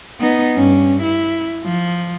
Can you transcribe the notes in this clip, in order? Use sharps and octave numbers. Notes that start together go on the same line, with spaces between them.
B3 D#4
G2 C#4
E4
F3